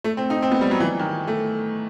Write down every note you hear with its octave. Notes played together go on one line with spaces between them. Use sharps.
A3
C4
D#4
C4
B3
G3
F#3
E3
D#3
A3